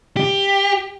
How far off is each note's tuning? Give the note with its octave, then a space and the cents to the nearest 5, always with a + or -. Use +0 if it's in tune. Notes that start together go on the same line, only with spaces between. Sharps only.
G4 +10